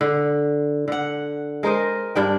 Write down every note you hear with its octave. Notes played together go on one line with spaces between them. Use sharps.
D3
D3 F#5
G#3 A#4 C5 D#5
G2 D4 G5